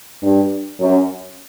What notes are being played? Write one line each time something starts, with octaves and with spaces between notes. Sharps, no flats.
G2
F#2